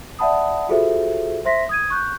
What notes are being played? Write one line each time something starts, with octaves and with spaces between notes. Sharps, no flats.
D5 E5 F#5 A5 B5 D#6
F4 F#4 G#4 A4 C5 E5
C5 E5 C6 A#6 B6
D#6 G#6 D#7
C#6 F#6 G6